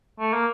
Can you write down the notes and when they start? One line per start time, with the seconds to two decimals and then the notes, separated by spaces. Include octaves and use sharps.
0.19 A3
0.33 A#3